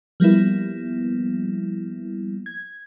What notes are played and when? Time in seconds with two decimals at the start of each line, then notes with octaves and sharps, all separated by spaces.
0.20 F3 G3 A#3 B3 E4
2.46 G#6